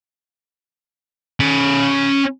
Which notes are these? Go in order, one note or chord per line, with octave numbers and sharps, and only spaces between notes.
C#4 B5